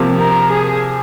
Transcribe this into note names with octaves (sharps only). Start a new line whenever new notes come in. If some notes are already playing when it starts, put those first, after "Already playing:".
Already playing: C3 F3 A#3
A#4
G#4